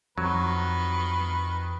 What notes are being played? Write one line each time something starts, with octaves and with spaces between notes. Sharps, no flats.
F2 D#3 F#3 B4